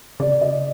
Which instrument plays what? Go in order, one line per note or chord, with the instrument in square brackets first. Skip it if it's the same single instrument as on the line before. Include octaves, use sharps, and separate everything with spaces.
[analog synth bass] C#3 [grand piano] D5
[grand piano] D#5